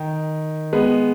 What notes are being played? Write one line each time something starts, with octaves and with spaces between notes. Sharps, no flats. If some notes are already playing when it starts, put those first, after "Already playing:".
Already playing: D#3
G#3 B3